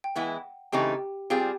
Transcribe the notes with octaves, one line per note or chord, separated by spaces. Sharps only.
G5
E3 G#3 B3 E4 F#5
C#3 E3 A3 C4 D#4 G4 G5
G3 C4 F4 G4 G#4 G5